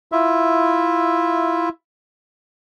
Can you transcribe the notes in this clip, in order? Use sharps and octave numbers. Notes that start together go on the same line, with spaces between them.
E4 F4 E5